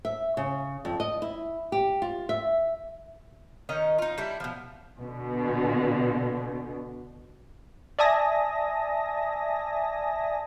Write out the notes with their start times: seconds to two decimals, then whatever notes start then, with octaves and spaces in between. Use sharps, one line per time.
0.05 E5
0.37 C#3
0.85 F2
1.00 D#5
1.22 E4
1.72 G4
2.02 F4
2.29 E5
3.69 D#3 C#4 D#4 D#5
3.98 D#4 F4
4.18 G3 D4 E4
4.40 B2 F3
5.00 B2 D3
7.99 D5 E5 G#5 A5 D#6 A#6